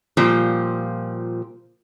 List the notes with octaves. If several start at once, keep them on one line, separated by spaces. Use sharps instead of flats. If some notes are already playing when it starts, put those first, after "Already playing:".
A#2 F3 G3